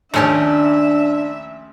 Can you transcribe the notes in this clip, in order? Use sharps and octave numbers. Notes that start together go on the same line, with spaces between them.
A#1 D#2 A3 C#4 D4 G4 E5